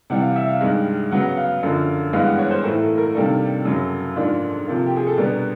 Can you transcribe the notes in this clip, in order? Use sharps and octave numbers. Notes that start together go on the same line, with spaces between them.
C3 E3 G3 F#5
F5
E5
F5
G2 D#3 G#3
C#3 F#3 B3 F#5
F5
F#2 D3 F3
G2 E3 G#3 B3 F5
F#5
C#5
C5
A2 E3 A3 A#4
A4
A#4
C3 D#3 G3 A#3 D4 A4
F#2 C#3 F#3
G#2 F3 A#3 D4
C3 F3 A#3
G4
G#4
A4
B2 G3 B3 D4 A#4